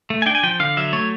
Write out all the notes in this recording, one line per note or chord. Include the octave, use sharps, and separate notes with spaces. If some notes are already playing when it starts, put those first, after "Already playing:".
A3
G#5
D4 G5
G#5
F3 G5
D3 F5
F#3 E5
A3 C#5